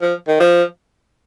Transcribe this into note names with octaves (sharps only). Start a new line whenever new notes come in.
F3
D#3
F3